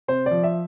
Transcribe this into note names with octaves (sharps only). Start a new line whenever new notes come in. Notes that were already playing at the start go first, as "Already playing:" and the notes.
C3 C5
D5
F3
E5